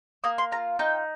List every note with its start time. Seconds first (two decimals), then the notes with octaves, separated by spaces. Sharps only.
0.24 A#3 D#6
0.38 C6
0.52 F4 A#5
0.79 D#4 G5